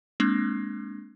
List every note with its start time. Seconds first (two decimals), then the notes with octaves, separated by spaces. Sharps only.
0.20 G#3 A#3 C4 D4